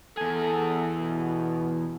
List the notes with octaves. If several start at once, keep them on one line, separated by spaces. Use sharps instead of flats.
E2 G#4 A4
B2